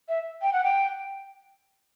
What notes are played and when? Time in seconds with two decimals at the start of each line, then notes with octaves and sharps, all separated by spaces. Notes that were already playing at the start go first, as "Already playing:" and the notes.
0.09 E5
0.42 G5
0.53 F#5
0.64 G5